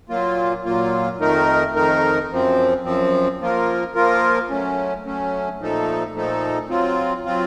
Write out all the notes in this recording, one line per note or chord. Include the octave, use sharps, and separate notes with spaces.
A#2 F#3 A#3 F4
A#2 F#3 A#3 F4
F2 D#3 A3 D#4 A#4
F2 D#3 A3 D#4 A#4
F#2 F3 C4
F#2 F3 C4
F3 A#3 F4 A#4
F3 A#3 F4 A#4
F#3 A3 C#4
F#3 A3 C#4
A#2 F3 A3 D#4 A4
A#2 F3 A3 D#4 A4
F#3 C4 F4
F#3 C4 F4